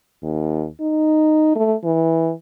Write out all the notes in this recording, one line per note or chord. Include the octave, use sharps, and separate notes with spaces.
D#2
D#4
A3
E3